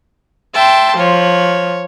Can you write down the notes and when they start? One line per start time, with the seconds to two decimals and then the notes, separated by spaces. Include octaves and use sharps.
0.54 E5 G5 A5 C6
0.98 F3 C#5